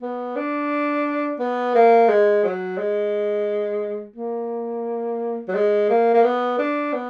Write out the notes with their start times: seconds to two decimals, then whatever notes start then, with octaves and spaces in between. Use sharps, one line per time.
0.02 B3
0.36 D4
1.40 B3
1.75 A#3
2.09 G#3
2.44 F#3
2.78 G#3
4.16 A#3
5.48 F#3
5.55 G#3
5.90 A#3
6.14 A#3
6.24 B3
6.59 D4
6.93 B3